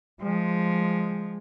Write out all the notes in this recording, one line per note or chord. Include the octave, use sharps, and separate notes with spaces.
F3 G#3